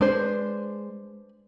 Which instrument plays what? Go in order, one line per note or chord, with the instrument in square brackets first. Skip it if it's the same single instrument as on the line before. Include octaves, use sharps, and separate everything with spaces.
[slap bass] G#3 [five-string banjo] D4 B4 C5